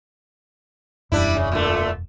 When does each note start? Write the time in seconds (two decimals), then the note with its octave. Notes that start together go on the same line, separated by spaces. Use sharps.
1.12 E1 F#2 E3 G3 D4 E4
1.37 C#3
1.52 A#2 D3 A3